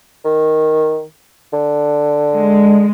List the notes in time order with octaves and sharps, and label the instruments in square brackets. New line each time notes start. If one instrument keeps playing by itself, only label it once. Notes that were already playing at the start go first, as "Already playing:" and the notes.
[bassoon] D#3
D3
[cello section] G#3